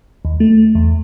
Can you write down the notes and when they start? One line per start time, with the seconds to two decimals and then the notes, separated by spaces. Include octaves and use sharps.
0.25 D#2
0.40 A3
0.75 E2